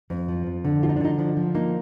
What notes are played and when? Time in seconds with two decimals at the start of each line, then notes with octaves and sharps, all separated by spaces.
0.10 F2
0.29 F3
0.47 F2
0.65 D3
0.82 F3 F4
0.89 D#4
0.96 D4
1.01 D3 D#4
1.18 F3 D4
1.37 F3
1.55 A#3 D#4